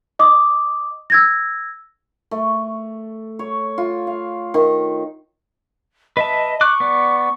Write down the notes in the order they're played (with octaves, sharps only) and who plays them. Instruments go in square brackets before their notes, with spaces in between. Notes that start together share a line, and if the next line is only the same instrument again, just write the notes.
[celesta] D#5 D6 D#6
E6 G#6 A#6
[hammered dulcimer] A3
C#5
F4
F5
D#3
[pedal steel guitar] B4 E5 A5 [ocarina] D#5
[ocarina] C#6 [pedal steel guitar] D6 F#6
[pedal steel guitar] B3 D5